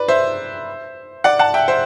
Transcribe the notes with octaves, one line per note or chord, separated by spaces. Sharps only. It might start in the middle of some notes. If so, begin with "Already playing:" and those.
Already playing: B4 D5
C5 E5
D5 F#5
F#5 A5
E5 G5
C5 E5